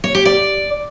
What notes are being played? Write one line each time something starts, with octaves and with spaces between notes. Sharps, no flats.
C#5
G4
D5